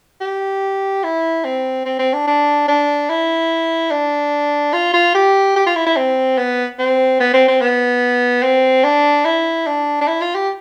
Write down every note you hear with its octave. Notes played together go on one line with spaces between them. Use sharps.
G4
E4
C4
C4
C4
D4
D4
D4
E4
D4
F4
F4
G4
G4
F4
E4
E4
C4
B3
C4
B3
C4
C4
B3
C4
D4
E4
D4
D4
E4
F4
G4